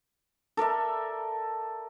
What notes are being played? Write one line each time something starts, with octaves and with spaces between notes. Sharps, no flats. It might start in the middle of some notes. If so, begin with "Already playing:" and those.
A4 A#4 D5 E5